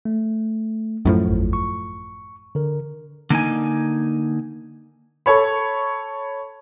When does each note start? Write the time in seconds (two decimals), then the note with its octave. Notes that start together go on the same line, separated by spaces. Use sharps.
0.05 A3
1.05 F#2 A2 F3
1.28 G#1 E2
1.53 C#6
2.55 D3 A#4
3.30 D3 A#3 D#4 G#5
5.26 A4 C#5 B5